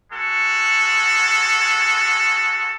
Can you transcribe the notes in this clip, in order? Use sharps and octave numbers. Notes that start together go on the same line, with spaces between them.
G#3 F#4 A4